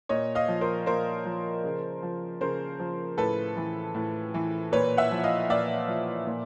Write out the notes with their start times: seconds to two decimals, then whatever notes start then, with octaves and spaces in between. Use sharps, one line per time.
0.09 A#2 C#5 D#5
0.35 D#5 F5
0.48 F3
0.61 A#4 C5
0.86 A#2 A#4 C5
1.25 F3
1.64 C#3
2.03 F3
2.41 C#3 A#4 C5
2.80 F3
3.18 A2 A4 B4
3.57 E3
3.95 A2
4.34 E3
4.72 A#2 B4 C#5
4.97 E5 F#5
5.12 F3
5.24 D#5 F5
5.50 A#2 D5 E5
5.88 F3
6.27 A#2